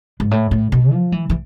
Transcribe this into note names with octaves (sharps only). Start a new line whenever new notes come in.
G#2
A2
A2
B2
F3
E3
E3